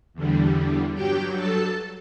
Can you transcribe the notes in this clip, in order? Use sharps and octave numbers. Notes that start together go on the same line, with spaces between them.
E2 D3 G3
G2 F#3 G4 G5
A4 A5